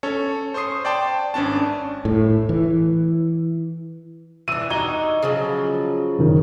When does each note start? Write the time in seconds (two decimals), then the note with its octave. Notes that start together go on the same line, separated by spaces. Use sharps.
0.03 C#4 A4 C#5
0.54 C5 C6 C#6 D#6 C7
0.85 D5 G5 A5 C6
1.34 G#1 C#4 D4 A5
2.05 A2
2.49 E3
4.48 E3 D4 E6 D#7
4.70 D#4 F#4 G4 G#6 G7
5.22 C#3 F3 F#3
6.18 F#1 D#3